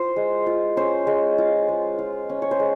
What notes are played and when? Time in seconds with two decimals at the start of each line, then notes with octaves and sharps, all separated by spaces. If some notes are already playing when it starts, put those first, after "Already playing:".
Already playing: F4 C5
0.16 G#3
0.46 F4
0.77 C#4 C5
1.07 G#3
1.38 F4
1.68 G#3
1.99 F4
2.29 C#4
2.42 C#5
2.51 C5
2.60 G#3